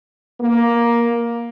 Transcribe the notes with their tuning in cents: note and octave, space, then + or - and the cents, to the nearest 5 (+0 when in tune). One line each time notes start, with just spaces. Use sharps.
A#3 +10